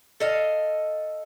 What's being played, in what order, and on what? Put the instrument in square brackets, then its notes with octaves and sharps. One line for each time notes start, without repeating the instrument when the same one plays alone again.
[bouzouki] A4 D#5 F5